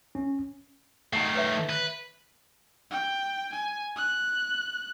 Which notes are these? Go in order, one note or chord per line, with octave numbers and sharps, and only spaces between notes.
C#4
D#3 A3 F#5
B4 C#5 E5
B4
G5
G#5
F#6